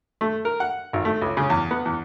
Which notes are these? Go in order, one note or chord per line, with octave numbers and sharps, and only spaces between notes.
A3
A#4
F#5
G#1
A3
C#2
C#3
E2
B3
E2